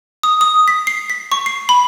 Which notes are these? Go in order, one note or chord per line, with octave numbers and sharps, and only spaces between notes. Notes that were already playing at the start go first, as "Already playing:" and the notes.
D#6
D#6
B6
C7
B6
C#6
C7
B5